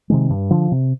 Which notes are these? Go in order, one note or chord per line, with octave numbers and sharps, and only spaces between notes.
C3 D#3 G#3
G2
D3 F3
C3